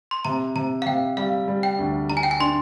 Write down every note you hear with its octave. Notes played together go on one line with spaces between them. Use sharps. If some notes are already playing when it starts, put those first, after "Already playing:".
C6
C3 A#5
C3 A#5
F5
C3 G5
G3 F5
G3
G5
D2
D4 A#5
G#5
G5
G#5
D4 C6